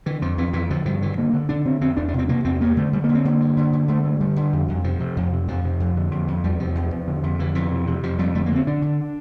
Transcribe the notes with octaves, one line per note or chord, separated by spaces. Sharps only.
D3 E3
F2 F3
F2 E3
F2 E3
D3 F3
G2 F3
D3 E3
D3 A#3
D3
D3 D4
D3 C4
F2 C4
E2 D4
D4
C3
C4
C3 A#3
E2 C4
G2 A#3
D3 A3
D3 G3
D3 A#3
C4
D3 A#3
G2
D3
D3
D3 A3
G2 A3
D3 G3
D3
F2
F2
C3 F3
C3
F2
C3
F2 F3
C3
F2
D3
F2
F2
E2 G3
C3 F3
E2
E2
D3
F2
D3 E3
F2 E3
C3
C3
F2 F3
F2 G3
D3 A3
A#3
D3 C4
D3 D4
D3